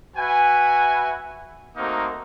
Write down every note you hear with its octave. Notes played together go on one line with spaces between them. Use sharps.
F#4 B4 E5 G#5
A3 A#3 C4 D#4 F#4 A#4